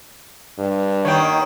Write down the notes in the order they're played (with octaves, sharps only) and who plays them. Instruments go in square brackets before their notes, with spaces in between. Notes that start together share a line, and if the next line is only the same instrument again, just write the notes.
[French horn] G2
[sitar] D#3 A#3 B3 [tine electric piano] C#5 G5